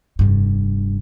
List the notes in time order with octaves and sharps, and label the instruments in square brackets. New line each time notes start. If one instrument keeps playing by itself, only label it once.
[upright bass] F1 G2